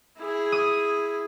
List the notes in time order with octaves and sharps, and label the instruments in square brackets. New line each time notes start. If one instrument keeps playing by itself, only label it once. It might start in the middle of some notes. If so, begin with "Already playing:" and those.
[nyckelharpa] E4 G#4
[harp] D#6